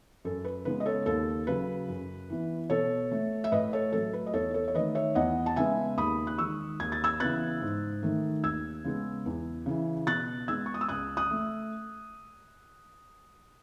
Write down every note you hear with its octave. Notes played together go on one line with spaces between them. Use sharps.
F#2 A4
B4
C#3 G#3 B3 B4
D#5
A4 C#5
D#2 A4
C#3 F#3 B4
F#2
E3 B3
B2 A4 C#5
A3
E5
A2 B4 D#5
A4 C#5
F#3 A3 A4
B4
D#5
E2 A4 C#5
A4 C#5
C#5
D#3 A3 B4 D#5
C#5 E5
E2 D#5 F#5
A5
C#3 G#3 B3 E5 G#5
D#2 B5 D#6
F#6
D#3 G#3 C#6 E6
D#2 G#6
A6
E6 G#6
C#3 E3 B3 F#6 A6
G#2
D#3 A3
D#2 E6 G#6
C#3 G#3 B3
E2
C#3 E3
B2 F#6 A6
G#3 B3 E6 G#6
C#6
D#6
E6
C#2 D#6 F#6
D#6 F#6
A3